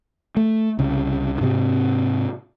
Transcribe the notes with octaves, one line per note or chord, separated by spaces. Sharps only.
A3
C2 C#3
G#2 C3 C4